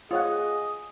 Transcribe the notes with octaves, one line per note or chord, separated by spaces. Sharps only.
F4 G#4 C#5 D#5 F#5